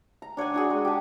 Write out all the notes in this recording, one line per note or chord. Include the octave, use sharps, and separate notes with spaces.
A#5
D4 C#5 F#5 G#5
D4 F#4 G#4
G#3
G4 A5